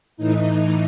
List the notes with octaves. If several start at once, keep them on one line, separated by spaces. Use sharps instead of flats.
A2 E3 D#4